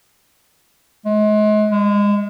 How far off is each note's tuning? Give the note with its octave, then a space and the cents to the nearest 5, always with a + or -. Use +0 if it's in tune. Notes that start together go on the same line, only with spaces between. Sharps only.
G#3 +35
G#3 -25